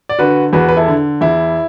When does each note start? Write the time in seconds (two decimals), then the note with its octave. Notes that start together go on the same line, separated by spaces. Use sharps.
0.09 D5
0.19 D3 F#4 B4
0.53 E2 F#4 B4
0.68 B4
0.77 E4 A4
0.88 D3
1.21 E2 E4